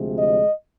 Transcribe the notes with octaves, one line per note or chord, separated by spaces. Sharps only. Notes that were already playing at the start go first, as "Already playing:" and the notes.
Already playing: D2 C3 F3 G#3
D#5